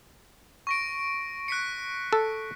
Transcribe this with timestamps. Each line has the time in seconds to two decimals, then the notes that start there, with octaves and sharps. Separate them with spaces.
0.67 C#6 A#6 D7
1.48 F#6 B6 C#7
2.13 A4